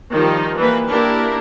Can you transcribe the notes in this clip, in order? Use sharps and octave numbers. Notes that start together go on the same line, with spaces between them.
D#3 F3 G3 D#4
E3 G3 A#3 B4
A#3 D4 E4 G4 A#4